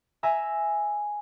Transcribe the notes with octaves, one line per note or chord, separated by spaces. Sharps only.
E5 G#5 A#5 E6